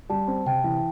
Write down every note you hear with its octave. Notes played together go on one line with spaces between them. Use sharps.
G3 A5
C4
C3 G5
E3